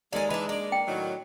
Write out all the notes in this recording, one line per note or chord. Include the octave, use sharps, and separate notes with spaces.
D#2 G#3 A4 A#4 D5 G#5
E3 D4 D#4 B4
A#3 D4 D5
G5
A2 D#3 F#3